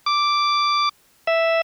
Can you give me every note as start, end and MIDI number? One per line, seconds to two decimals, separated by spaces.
0.06 0.89 86
1.27 1.61 76